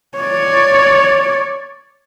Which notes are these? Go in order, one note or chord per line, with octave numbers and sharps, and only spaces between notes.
C#5 D5